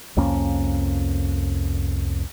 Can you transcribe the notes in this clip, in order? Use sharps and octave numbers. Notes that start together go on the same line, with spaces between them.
C2 F2 A#3 C#4